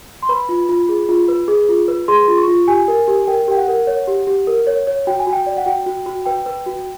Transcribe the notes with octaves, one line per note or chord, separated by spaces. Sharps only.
C6
B4 B5
F4
F4
G#4
F4
B4
G#4
F4
B4
G#4 C6
F4
C#6
F4
G4 G#5
A#4
G4
A#4 G5
G4 G5
F#5
A#4
C#5
G4
G4
A#4
C#5
C#5
F#4 G5
G#5
F#4
G5
D5
F#5
F#4 G5
F#4
F#4
B4 G5
B4
F#4